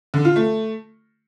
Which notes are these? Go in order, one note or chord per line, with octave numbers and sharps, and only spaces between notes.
D3
F4
A3